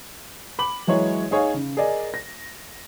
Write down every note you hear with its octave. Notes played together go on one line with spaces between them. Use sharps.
B5 D6 F#7
E3 F#3 G#3 E4 C#5
D#4 G#4 C#5 F5
C#3
G#4 A#4 D5 D#5
A#6